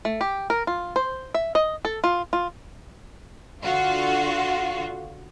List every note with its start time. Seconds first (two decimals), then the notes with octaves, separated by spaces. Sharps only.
0.05 A3
0.21 G4
0.50 A#4
0.67 F4
0.96 C5
1.34 E5
1.55 D#5
1.85 A4
2.04 F4
2.33 F4
3.63 D3 F4 F#4